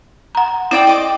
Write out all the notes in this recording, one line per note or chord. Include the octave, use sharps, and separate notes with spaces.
F#5 A#5
C4 E4 D5 G5
D#5 D6